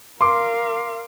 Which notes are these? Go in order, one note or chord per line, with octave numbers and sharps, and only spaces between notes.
A#4 F5 C6 D6